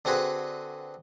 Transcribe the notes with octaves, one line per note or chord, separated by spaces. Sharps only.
D3 C4 F#4 G#4 B4